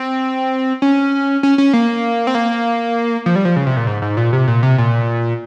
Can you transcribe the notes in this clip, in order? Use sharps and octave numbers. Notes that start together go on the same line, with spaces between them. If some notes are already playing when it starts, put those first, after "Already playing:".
Already playing: C4
C#4
C#4
C#4
A#3
C4
A#3
F3
G3
F3
C#3
C3
A#2
G#2
G#2
A#2
C3
A#2
C3
A#2